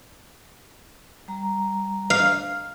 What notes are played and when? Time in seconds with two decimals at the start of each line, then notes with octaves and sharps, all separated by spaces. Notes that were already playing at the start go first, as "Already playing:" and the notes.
1.28 G3 A#5
2.10 F5